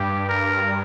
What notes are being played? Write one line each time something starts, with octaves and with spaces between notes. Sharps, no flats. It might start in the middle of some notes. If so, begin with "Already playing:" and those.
Already playing: G2 G4
A#4